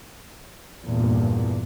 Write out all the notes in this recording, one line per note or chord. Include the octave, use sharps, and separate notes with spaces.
E2 G2 A#2